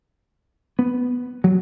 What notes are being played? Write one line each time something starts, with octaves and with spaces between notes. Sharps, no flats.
B3
F#3